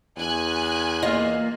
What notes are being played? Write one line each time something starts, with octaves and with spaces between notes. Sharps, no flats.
E2 G#5 F#6
A#3 F4 D#5 F5